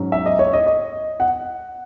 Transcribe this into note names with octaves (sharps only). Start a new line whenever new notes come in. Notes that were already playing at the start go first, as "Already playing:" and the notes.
Already playing: G#2 F#3 C#4
E5
D#5
C#5
D#5
D#5
F#5